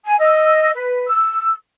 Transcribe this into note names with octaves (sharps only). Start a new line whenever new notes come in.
G#5
D#5 E6
B4
E6